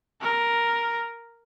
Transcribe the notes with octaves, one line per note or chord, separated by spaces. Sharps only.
A#4